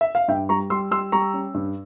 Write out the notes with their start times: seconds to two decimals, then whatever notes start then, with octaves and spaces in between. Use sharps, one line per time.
0.01 E5
0.15 F5
0.28 G2 E5 G5
0.49 G3 A#5 C#6
0.70 G3 C6 E6
0.91 G3 C6 E6
1.12 G3 A#5 C#6
1.34 C#4
1.54 G2